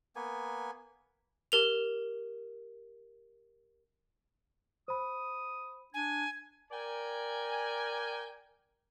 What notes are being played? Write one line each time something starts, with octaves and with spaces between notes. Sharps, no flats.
A#3 B3 G#5
G4 A#4 F7
C5 B5 D#6
D4 G#5 G#6
A#4 D5 G5 G#5